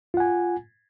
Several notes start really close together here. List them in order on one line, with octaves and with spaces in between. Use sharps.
F4 F#5 G#5